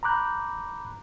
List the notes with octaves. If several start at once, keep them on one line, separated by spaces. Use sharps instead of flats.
A#5 B5 D6 F#6 G6